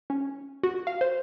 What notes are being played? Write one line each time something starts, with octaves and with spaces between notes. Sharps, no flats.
C#4
F#4
F5
C5